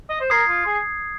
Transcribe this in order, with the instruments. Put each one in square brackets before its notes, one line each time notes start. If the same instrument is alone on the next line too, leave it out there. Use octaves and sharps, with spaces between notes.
[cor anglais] D#5
C5
[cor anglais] A#4 [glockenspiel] D#6 G#6 C7
[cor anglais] F4
G#4